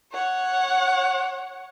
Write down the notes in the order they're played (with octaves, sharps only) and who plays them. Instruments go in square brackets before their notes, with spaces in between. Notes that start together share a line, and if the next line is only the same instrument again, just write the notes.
[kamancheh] C#5 F#5